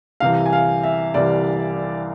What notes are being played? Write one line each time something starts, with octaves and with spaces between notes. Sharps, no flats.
C2 C3 E3 F5
G#5
F5
E5
C2 C3 E3 D5